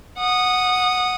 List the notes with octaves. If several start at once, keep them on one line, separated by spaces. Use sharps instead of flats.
F#5 D#6